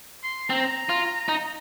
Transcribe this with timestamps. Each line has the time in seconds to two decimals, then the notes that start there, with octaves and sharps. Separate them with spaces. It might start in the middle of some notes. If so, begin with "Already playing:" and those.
0.23 C6
0.50 C4 A#5
0.89 F4
1.29 D#4